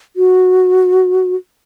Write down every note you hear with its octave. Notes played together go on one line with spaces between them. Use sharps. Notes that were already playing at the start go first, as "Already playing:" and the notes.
F#4